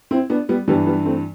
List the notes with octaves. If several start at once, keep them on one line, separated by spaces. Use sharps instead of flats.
C4 E4
B3 D4
G3 B3
G2 E3 G3 B3
G3 B3
A3 C4